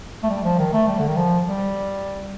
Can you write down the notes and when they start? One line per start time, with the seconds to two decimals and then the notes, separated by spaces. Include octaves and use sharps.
0.23 A3
0.30 G3
0.44 F3
0.59 D#3
0.73 A3
0.88 G3
0.99 D3
1.08 D#3
1.17 F3
1.47 G3